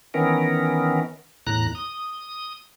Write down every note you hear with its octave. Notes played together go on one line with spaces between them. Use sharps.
D#3 E3 B3 C#4 A#4
E2 A2 A#5 F#6
D#6